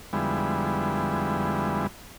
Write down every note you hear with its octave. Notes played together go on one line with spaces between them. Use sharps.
F2 D3 G3 G#3 B3 E4